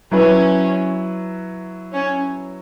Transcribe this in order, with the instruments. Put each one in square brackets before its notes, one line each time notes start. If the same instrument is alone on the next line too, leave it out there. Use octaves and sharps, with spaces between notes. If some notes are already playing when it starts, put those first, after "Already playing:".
[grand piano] F#3 E4 B4 [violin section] C#4
[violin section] C#4